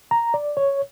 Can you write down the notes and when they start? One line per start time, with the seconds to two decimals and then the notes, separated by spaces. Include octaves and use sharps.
0.11 A#5
0.34 D5
0.57 C#5